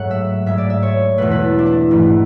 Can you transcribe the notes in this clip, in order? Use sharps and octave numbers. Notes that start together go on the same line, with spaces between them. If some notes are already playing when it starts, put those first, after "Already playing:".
Already playing: G#2 F#3 A3 F#5
E5
G#2 G#3 E5
D5
E5
C#5
E2 B2 A3 B4
B4
A4
D4
E4
G#2 E3 A3